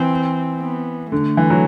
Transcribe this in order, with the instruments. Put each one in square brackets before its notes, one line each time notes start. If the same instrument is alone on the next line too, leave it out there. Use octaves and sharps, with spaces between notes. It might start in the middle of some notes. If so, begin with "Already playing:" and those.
Already playing: [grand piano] E3 [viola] C4
[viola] B3
[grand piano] D3 [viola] A3
[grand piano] E3
F#3